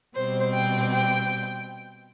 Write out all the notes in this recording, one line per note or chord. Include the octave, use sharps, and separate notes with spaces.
B2 G3 C4 C5
G5
G5